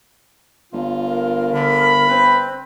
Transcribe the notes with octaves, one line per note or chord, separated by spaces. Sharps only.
G1 F4
A#4
D3 B5
C4 B4